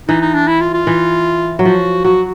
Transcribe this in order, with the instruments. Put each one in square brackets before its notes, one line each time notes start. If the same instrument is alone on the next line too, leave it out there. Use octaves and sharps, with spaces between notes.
[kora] E3 [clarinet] D#4
[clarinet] D#4
D4
E4
F4
F4
[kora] E3
F#3
[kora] F3 [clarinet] F#4
[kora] F#3 [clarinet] F#4